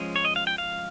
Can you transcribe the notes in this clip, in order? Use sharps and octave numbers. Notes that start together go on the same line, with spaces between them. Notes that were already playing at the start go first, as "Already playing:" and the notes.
Already playing: F3 G#3 C#4
C#5
D#5
F5
G5
F5